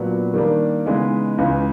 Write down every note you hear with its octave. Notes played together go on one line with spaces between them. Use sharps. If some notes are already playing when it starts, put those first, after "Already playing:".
Already playing: A#2 F#3 B3 D4
D#3 G3 A#3 D4
C#3 E3 G#3 B3 D#4
C#2 C#3 E3